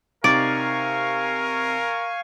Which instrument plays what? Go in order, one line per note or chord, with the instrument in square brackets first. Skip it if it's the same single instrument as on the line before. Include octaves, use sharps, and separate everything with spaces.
[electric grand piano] C3 D#4 [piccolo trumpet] A#4 [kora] D5 [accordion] F5 G#5 C#6